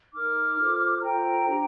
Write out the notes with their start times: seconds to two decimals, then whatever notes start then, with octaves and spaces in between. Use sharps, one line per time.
0.14 D#4 A#4 D6 F6
0.59 F4 A4 C5
1.02 F4 A4 C5 G5 A#5
1.47 D4 G4 C5